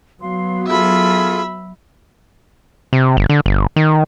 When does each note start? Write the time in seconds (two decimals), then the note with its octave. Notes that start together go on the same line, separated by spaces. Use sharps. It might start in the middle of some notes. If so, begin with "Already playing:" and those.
0.21 F#3 B3 F5 C6
0.67 F4 G#4 A4 E5 B5
2.93 C3
3.17 G1
3.29 D3
3.46 G1
3.76 D#3